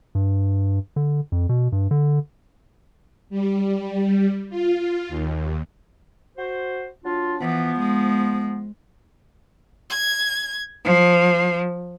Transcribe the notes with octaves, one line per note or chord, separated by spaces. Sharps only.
G2
D3
F2
B2
G2
D3
G3
F4
D#2
F#4 C5
F#3 D4 F4
E3 F3 B3
G#3
G#6
F3